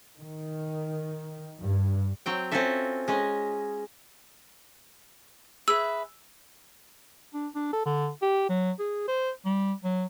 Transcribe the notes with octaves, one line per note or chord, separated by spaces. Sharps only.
D#3
G2
F#3 C4 G5
C4 C#4 F4 F#4 A4 E5
G#3 C#4 D#5
G#4 B4 E5 E6
D4
D4
A4
D3
G4
F#3
G#4
C5
G3
F#3